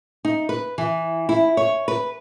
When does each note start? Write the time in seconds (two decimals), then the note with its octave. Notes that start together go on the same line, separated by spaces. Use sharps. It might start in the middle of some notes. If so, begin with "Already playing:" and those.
0.25 D#4
0.49 B4
0.78 E3
1.29 E4
1.57 C#5
1.88 B4